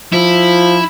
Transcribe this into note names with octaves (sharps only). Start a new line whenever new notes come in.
F3 E4